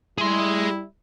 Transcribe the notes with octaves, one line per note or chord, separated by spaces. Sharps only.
G3 E4 G#4 C6